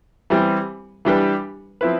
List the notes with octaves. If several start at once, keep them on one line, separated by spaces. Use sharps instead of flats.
E3 G3 C4
E3 G3 D4 G4 B4
F3 C4 E4 B4